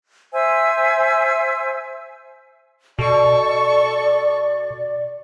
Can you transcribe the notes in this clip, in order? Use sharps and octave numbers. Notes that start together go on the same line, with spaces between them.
C5 E5 G#5 E6
B2 A4 D5 C#6